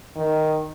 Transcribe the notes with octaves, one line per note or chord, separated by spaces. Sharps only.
D#3